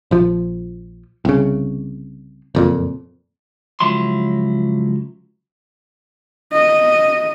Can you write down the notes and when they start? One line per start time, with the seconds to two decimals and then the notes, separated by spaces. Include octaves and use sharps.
0.11 A#1 F3
1.25 C2 C#3
2.55 F#1 F2 A#2
3.80 C#2 F3 F#3 E4 C6
6.53 D#5